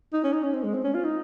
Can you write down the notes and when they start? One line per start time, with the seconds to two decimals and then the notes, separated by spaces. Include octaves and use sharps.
0.13 D#4
0.24 C#4
0.33 D#4
0.43 C#4
0.53 C4
0.63 G#3
0.74 C4
0.84 C#4
0.94 F4
1.04 D#4